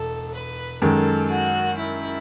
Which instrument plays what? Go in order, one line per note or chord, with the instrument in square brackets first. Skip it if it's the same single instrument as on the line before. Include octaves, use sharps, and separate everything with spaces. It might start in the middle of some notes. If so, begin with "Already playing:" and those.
Already playing: [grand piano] E1 [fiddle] A4
[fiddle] B4
[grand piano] F#2 D#3 G#3 [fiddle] A4
[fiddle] F#4
E4